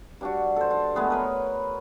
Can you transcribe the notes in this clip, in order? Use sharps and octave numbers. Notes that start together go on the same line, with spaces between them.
G2 D4 F#4
A4 C5
C5 A5
G#3 A3 B3 G#4
A#4 B4 C#5